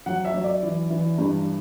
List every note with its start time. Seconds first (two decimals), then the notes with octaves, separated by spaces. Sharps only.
0.06 F#3 F#5
0.25 E5
0.34 F#3
0.44 D5
0.62 E3
0.90 E3
1.18 G2